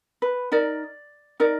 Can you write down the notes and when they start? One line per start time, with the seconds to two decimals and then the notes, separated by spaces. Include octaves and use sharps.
0.22 B4
0.52 D#4 A#4 D5
1.40 D#4 A#4 D5